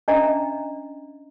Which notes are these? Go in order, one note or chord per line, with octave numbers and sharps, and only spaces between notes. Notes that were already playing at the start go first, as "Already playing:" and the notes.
C#4 D4 D#5 E5 A#5